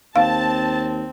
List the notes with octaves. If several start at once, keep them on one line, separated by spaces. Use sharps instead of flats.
D#2 C4 F5 A5